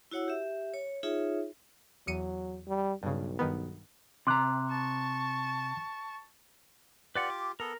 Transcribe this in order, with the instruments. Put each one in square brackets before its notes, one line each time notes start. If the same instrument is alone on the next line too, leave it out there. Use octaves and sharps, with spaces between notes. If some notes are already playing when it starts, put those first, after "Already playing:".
[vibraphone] E4 F#4 C#5 F#5 E6
G4 E5
C#5
D#4 F4 G#4 C#5 E5
[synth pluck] E2 C#7 D#7 [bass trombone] F#3
[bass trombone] G3
[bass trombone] B1 [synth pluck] G2 C#3
[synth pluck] G2 D#3 B3
[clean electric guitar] C3 A#5 [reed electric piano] C6 D6 F#6
[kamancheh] A5 C#6
[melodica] F4 G4 [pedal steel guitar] B4 D5 F#5
[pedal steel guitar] D6
[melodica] B3 A4 [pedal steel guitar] A#4